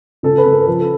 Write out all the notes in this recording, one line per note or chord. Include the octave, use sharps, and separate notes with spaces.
C#3 A4
B4
C#3
A#4
F3 A4